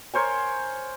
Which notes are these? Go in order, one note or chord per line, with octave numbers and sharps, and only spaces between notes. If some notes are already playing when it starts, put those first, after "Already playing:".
A#4 C5 C#5 G#5